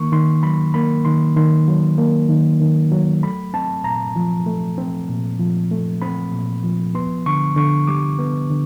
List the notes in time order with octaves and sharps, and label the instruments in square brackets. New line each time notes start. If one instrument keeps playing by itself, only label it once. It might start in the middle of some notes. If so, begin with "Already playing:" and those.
Already playing: [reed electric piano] D#3 A#3 C#6
D#3 C6
F#3 B5
A#3 B5
D#3 C6
D#3 C6
F#3
A#3
D#3
D#3
F#3
A3 B5
C4 A5
A#2 A#5
F3
A3
C4
A#2
F3
A3
C4 B5
A#2
F3
B3 C6
D3 C#6
D3 C#6
G3 D6
B3
D3